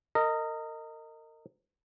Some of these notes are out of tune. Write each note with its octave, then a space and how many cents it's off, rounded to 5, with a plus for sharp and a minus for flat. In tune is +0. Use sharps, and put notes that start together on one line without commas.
A#4 -30 D#5 +0